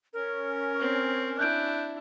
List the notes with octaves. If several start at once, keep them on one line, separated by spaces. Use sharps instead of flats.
C#4 A#4
C4
D4 E4 F#6 G6 D7